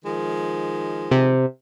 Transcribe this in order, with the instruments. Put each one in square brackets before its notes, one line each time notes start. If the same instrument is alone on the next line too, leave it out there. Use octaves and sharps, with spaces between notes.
[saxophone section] D#3 F3 G#3
[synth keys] C3